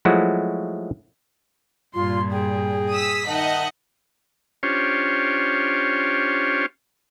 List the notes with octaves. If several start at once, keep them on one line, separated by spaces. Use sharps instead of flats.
F3 F#3 G#3 A3 E4 F#4
G2 A#2 F4 C6
G#4 G5
D#6 E6 B6
D#3 D#4 D#5 E5 F#5 A5
C#4 D4 F4 G4 C5 C#5